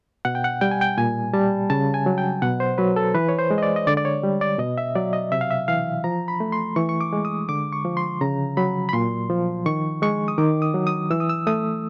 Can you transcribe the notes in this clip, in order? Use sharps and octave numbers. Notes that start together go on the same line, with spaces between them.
B2 F#5
G5
F#5
G3 G5
G#5
G5
A#2 G#5
G3 A5
C#3 A5
G#5
F#3
G5
B2 F#5
C5
F#3 B4
A4
E3 B4
C#5
C5
G#3
D#5
D5
D#5
D3 D5
D5
C#5
G3
D5
B2 D#5
E5
F#3 D5
D#5
C3 E5
F5
E5
E3 F5
F3 A#5
B5
A3
C6
E3 C#6
C#6
D6
G#3
D#6
D3 D6
C#6
F3
C6
C#3 A#5
F#3 B5
B5
A#2 C6
F3
D#3 C#6
G#3 C#6
D#6
D#3 D6
D#6
F#3
D#6
E3 E6
D#6
E6
A3 D#6